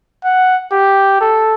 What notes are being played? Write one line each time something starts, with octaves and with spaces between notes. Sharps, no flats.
F#5
G4
A4